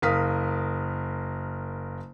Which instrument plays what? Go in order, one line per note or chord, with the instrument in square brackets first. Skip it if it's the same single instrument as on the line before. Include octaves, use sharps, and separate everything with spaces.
[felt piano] F#1 A#4 F5 D#6 B6